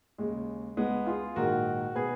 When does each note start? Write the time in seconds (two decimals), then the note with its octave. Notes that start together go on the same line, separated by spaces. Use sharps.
0.18 D#2 C#3 G#3
0.77 C#2 C#3 G#3 B3
1.06 F4 G#4
1.36 A#1 G#2 D#3 F#4 A#4
1.95 B2 G#4 B4